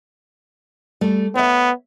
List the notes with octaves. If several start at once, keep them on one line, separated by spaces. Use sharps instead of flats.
G3 A3
B3 C#5 E5